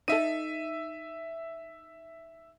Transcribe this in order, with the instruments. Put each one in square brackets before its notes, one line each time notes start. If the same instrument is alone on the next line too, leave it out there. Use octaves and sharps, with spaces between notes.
[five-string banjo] D#4 A4 [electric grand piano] E5 D#7